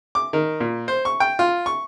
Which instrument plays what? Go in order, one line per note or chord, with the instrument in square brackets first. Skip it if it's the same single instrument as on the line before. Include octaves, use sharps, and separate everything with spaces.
[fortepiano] D6
D#3
A#2
C5
C#6
G5
F4
C#6